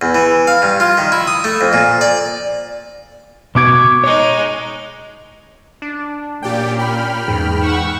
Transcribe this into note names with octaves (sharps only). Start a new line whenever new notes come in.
E2
E3
F5
G2
F4
D#3
E4
D#6
A3
F2
A#2
D5
B2 B3 F#4 C#6 D6 G#6
G#3 D#4 C#5
D4
A#2 A#3 C#4 G4 D5 G5
G5 B5 F6
E2 G#2
F#5 C#6 E6